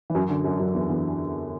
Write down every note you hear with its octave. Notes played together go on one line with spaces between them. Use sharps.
E3
F#2 F#3
D3
F#2 F#3
F#2 F#3
E2 E3
E2 E3